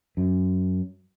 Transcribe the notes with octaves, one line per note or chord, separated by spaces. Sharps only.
F#2